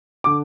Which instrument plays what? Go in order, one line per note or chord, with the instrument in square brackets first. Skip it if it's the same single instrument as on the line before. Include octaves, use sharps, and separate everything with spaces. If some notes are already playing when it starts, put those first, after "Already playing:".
[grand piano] D3 D6